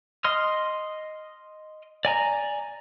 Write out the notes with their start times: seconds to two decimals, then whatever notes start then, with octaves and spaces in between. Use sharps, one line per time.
0.24 D#5 C6 D#6 F6
2.05 D5 G#5 A#5